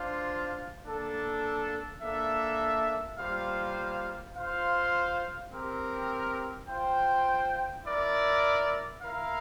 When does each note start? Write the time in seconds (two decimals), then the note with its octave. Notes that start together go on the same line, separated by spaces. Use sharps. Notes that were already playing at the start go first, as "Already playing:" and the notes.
Already playing: D4 F4 C5 F5
0.84 A#3 D4 A4
2.02 A#3 D4 A4 E5
3.18 G3 A#3 F4 C5 F5
4.34 F4 C5 F5
5.51 C4 G4 A#4
6.68 F4 C5 G5
7.85 E4 A#4 D5
9.01 E4 A#4 F5